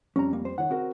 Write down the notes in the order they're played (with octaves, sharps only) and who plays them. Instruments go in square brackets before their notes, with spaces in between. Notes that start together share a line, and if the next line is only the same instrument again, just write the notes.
[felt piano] F2 G3 [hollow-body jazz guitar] C#4 A#5
[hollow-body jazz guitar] A#3
C5
[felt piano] D#3 C#5 [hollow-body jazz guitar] F#5
[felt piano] C4 F#4 A#4